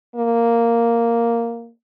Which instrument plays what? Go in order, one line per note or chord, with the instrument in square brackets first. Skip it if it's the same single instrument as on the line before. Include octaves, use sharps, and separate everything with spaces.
[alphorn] A#3